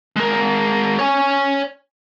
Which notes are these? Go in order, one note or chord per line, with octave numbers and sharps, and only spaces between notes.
G#3 A#4
C#5 G#5